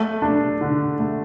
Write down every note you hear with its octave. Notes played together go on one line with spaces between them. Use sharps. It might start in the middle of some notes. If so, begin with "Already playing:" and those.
Already playing: A3
D4
D3
A3